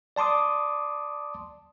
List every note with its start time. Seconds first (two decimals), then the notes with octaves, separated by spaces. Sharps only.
0.16 D5 A5 C6 D6 D#6